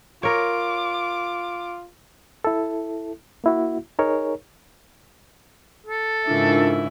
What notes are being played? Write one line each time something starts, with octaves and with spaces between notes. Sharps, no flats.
F4 A#4 C#5 D6
E4 A4
A#3 E4 F#4
D#4 G#4 A#4 C#5
A4
G#2 C#3 D4 E4 F4 A#4